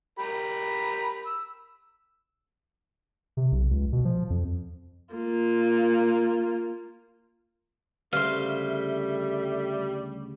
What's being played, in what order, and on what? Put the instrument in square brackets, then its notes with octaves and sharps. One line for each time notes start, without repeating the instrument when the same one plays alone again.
[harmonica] G4 A#4 B5
E6
[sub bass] C3
B1
C#2
B2
F3
F2
[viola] A#3 F4
[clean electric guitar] D2 C#3 C5 [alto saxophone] G3 [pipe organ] A4 E5 [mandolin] F5